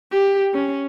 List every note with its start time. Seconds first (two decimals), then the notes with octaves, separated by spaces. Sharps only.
0.12 G4
0.54 C#4